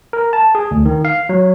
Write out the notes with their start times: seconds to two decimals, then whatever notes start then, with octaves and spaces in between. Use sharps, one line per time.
0.13 A#4
0.33 A5
0.55 G#4
0.71 D2
0.85 D#3
1.05 F5
1.29 F#3